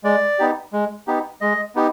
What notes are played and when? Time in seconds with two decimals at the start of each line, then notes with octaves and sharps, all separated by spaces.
0.04 G#3 D5
0.39 B3 D#4 G4
0.73 G#3
1.07 B3 D#4 G4
1.41 G#3 D#5
1.75 B3 D#4 G4